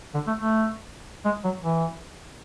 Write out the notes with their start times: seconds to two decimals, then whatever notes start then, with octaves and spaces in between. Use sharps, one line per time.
0.14 D3
0.27 A3
0.39 A3
1.25 G#3
1.44 F#3
1.63 E3